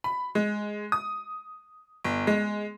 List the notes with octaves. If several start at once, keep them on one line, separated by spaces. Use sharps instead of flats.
B5
G#3
D#6
G1
G#3